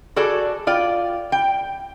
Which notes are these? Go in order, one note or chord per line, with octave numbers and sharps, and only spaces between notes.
F#4 G#4 A4 D5
F4 D5 G5
G5